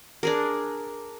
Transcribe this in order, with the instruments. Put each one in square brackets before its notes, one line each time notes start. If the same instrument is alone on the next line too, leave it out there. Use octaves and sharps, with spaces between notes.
[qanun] D4 G#4 A#4